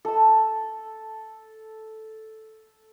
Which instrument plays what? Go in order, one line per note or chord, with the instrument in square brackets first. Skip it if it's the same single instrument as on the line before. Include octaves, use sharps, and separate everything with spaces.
[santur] A4 E6